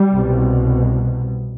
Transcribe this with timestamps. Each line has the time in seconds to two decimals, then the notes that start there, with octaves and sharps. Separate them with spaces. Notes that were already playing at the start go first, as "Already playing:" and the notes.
Already playing: G3
0.11 C2 B2